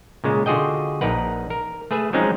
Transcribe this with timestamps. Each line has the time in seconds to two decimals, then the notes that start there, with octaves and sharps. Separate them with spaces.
0.24 A#2 C#3 G#3
0.46 D3 F4 F#4 G#4 D#5 G5
1.01 A#1 D#4 A#4 B4 F#5
1.50 A#4
1.91 A3 G#4 B4 E5
2.13 F3 F#3 G#3 C4 C#4 D#4